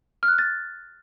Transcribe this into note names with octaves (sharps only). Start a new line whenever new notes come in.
F6
F#6
F6
A6